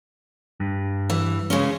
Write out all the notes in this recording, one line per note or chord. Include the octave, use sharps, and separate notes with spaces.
G2
E3
C#3 G#3 C#4